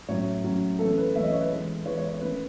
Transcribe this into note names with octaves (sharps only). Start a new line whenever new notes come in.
A2 F#3 C#4 C#5
A2 F#3 C#4
E3 A3 C#4 A4
B4
E3 A3 C#4 E5
D#5
C#5
B4
E3 G#3 B3
E3 G#3 B3 C#5
C#5
C#5
D#3 A3 C#4 B4